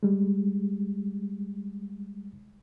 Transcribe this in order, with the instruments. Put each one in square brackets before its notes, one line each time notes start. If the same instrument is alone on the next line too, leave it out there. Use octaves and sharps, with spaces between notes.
[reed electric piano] G3 G#3